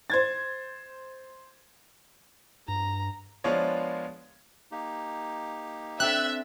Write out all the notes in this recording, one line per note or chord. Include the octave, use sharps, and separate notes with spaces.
C5 G#6 A6
G2 A#5
F3 G#3 B3 D4 F4 C#5
A#3 D#4 G4
C4 D4 A4 E5 F#6